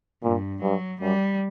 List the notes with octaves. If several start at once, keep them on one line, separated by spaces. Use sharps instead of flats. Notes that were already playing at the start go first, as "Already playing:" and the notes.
G2 A#2
G2 F#3
F#2 G3